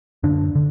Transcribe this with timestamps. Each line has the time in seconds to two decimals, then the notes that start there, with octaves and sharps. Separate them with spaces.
0.23 F#2 D3 D4
0.55 D3